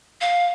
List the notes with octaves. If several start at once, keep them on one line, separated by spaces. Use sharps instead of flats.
F5